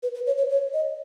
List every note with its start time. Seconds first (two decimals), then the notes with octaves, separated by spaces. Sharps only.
0.03 B4
0.15 B4
0.26 C#5
0.38 C#5
0.50 C#5
0.73 D#5